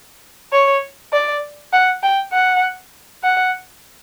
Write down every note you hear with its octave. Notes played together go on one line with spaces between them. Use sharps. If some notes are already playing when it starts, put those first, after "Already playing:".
C#5
D5
F#5
G5
F#5
F#5